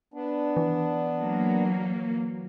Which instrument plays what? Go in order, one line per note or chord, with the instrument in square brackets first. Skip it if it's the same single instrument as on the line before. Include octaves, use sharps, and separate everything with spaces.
[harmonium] B3 D4
[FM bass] E3
[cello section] F#3 A#3